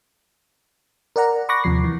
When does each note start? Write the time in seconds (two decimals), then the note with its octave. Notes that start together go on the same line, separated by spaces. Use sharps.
1.16 A#4 D5 F#5 A#5
1.49 B5 C#6 D6 F#6 A#6
1.64 D#2 C3 F3 C7
1.84 E3